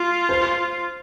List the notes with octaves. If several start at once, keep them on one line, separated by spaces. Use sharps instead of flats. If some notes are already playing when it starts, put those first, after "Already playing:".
Already playing: F4
C5